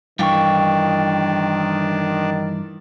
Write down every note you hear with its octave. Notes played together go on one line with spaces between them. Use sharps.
A1 G2 D#3 E3 D4 F5 G5 C#6